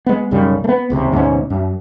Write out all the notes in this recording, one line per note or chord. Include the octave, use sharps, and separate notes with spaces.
G#3 B3
B1 F#2 C#3 G3
A3 B3
D#1 C#2 C3
D2 G#2 B2 C#4
F#2